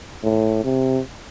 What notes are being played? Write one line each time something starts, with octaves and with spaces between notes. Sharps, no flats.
A2
C3